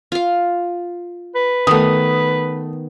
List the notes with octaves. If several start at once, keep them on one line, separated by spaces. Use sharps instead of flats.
F4 F5
B4
D#3 A3 B3 D#6